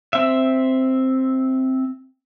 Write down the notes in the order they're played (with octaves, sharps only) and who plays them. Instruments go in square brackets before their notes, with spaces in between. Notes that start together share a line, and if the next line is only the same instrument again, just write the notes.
[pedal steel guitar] C4 E5